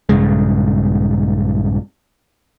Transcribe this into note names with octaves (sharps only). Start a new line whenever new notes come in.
A#1 G2 C#3 G#3